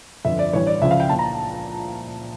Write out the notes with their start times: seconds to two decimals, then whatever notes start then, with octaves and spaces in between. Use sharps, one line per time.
0.25 G1 F2 D3 E5
0.39 D5
0.53 A1 G2 E3 C#5
0.67 D5
0.82 C#2 C#3 F3 E5
0.91 F5
1.00 G5
1.09 A#1 A#2 F3 A5
1.19 A#5